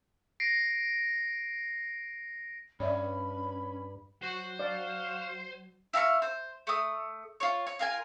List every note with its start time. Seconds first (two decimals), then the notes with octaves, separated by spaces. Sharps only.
0.40 A#6 C7 D7
2.80 G2 C#4 C#5 D5 E5 B5
4.22 F#3 F#4 C5
4.59 F#4 D5 F5
5.93 E4 F5 A#5 C#6
6.22 C5
6.67 A3 D#6
7.40 F4 C#5
7.67 C#5
7.79 F4 A#4 G#5